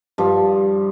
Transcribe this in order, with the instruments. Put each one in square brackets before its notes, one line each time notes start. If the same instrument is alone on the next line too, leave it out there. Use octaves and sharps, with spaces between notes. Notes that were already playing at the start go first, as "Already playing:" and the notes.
[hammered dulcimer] G2 F3